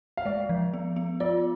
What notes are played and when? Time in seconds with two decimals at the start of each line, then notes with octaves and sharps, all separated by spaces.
0.17 F5
0.25 G#3 D5
0.49 F3
0.74 B3
0.96 B3
1.20 F4 D5